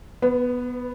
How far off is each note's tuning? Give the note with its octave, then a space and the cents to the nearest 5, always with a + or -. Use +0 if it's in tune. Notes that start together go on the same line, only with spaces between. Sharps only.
B3 +0 B4 +40